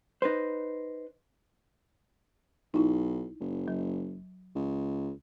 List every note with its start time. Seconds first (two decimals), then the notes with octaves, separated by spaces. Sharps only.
0.22 D#4 B4 C5
2.74 B1 D#4 E4
3.40 F#1
3.68 F#3
4.55 C#2